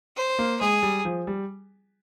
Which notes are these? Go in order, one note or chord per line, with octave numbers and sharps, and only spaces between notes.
C5
A#3
G#3 G#4
G3
F3
G3